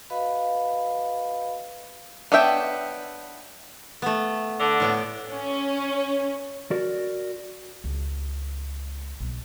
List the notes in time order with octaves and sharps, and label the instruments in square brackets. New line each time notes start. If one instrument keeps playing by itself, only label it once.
[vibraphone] F#4 B4 D#5 F5 B5
[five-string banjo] B3 D4 C#5 E5 G5
[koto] A3 B3
[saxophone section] D3
[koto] A2 B3 G5
[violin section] C#4
[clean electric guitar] F#4 A#4 D5
[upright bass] C#2
B1 B3